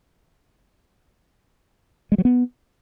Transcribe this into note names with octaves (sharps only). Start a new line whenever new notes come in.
G#3
F#3
B3